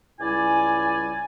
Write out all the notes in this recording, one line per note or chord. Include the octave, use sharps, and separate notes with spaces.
C#2 G3 E4 D5 G#5